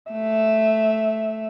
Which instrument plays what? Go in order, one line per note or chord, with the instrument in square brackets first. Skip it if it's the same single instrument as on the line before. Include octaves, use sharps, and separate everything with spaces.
[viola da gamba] A3 [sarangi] E5